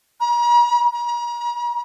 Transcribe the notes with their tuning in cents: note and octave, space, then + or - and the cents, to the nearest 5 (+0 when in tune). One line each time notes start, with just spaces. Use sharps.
A#5 +40
A#5 +40